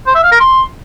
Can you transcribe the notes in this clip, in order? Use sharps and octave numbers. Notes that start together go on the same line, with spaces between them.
C5
E5
F5
A#4
C6